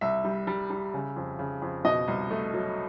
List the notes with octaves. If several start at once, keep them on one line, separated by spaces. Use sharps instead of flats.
C2 E5
G3
G3
G3
C#3
F2
C#3
F2
B2 D#5
C2
A3
F#3